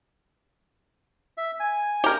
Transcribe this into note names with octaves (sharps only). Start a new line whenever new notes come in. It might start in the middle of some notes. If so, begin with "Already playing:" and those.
E5
G#5
G4 A#4